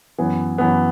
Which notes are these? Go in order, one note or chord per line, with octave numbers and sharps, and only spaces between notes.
F#2 E3 B3
F#2 E3 B3